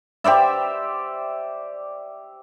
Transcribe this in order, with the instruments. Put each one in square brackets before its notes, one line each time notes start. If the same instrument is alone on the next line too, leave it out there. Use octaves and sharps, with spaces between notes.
[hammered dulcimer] G4 C5 D5 E5